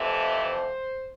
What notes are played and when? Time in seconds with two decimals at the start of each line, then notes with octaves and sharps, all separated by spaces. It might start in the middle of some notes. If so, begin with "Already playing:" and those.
Already playing: F2 C3 E3 A3
0.34 C5